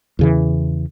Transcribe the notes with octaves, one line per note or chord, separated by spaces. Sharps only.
E2 C#3 E3